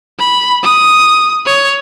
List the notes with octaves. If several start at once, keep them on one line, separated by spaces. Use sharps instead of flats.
B5
D#6
C#5